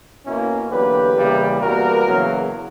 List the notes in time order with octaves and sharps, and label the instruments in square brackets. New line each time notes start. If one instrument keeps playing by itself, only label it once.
[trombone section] B2 A#3 C#4 E4
E2 D3 F#3 A#3 G4 B4
E2 C#3 E3 G3 A#3
E2 B2 G3 A#3 F#4 A#4
E2 C#3 F#3 A#3